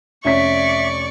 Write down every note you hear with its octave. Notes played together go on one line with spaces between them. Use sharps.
F1 C#4 D5 E5 C#6 B6